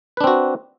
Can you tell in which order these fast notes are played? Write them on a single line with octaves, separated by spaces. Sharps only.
B4 D4 C4 F#4